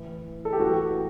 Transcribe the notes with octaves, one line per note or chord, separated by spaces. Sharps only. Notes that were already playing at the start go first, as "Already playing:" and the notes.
Already playing: A2 E3
A4
G4
A2 E3 F#4